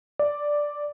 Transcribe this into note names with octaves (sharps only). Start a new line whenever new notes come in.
D5